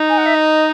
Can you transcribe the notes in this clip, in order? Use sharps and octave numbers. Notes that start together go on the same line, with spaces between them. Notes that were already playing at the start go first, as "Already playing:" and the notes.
Already playing: D#4
G#5
F#5
E5
D#5